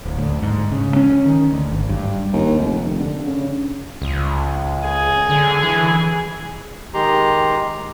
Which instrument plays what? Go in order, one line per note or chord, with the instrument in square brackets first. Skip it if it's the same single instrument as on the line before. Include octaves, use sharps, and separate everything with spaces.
[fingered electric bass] D1
D2
G#2
C#3
C#4
D#3
D2
G#1
G2
[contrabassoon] D#2
F1
F1
D3
C#3
[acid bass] C#2
[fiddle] G#4
[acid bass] D3
E3
[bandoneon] D#3 G#3 G4 A#5 C6